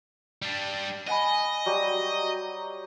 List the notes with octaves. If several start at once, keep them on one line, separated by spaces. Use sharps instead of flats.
G3 D4
D#5 F#5 G#5 B5
F#3 G3 G4